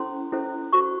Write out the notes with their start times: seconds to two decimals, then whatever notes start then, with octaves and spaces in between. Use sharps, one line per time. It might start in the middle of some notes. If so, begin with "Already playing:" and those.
Already playing: C#4 E4 A4 C5 C6
0.32 C#4 E4 A4 C5
0.73 F#4 A4 C5 C#6